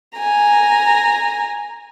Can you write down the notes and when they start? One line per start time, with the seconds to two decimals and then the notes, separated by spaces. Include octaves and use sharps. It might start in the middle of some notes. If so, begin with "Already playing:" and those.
0.18 G#5 A#5